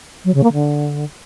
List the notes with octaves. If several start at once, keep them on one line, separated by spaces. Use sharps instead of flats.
F#3
C#3
A#3
D3